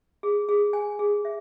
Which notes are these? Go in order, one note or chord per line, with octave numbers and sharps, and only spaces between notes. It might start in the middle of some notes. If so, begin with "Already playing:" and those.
G#4
G#4
G#5
G#4
E5